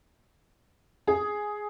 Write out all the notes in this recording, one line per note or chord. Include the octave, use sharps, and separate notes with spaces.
G#4